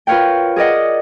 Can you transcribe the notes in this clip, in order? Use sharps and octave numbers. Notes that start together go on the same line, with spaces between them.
F4 A#4 B4 C#5 F5 G5
G#4 A#4 D5 D#5 F#5